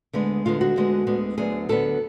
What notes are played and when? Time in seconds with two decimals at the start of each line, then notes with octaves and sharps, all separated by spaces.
0.13 D2 D3 G#3 B3
0.45 D2 D3 G#3 B3 F4
0.61 F#4
0.76 D2 D3 G#3 B3
1.07 D2 D3 G#3 B3
1.38 D2 D3 F#3 B3 G#4
1.69 D2 D3 F#3 B3 A4